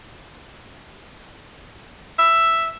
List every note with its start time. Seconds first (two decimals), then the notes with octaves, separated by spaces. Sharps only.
2.19 E5